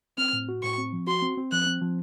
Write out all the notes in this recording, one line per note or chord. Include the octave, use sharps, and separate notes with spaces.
C4 F6
A2
F#4
A2 C#6
C4
F3
F#4 C6
C4
C4
F3 F#6
C4
F3